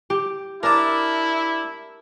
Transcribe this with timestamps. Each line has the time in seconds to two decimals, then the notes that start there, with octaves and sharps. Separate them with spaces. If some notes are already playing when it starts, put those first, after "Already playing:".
0.10 G4
0.63 D4 E4 A#4 D5 A5